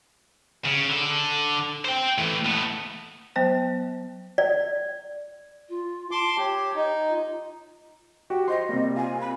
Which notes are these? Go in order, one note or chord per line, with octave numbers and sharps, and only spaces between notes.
C#3
D3 A4
C5 G5
E3 A3
A3 B3
F#3 B3 C5 G5
D5
F4
A5 C6 D6
G4 C#5
D#4
F4
F#4 G4
F3 D#5 C6
C3 G3 A#3
F4 G#5
B5